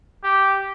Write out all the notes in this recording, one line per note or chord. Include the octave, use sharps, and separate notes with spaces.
G4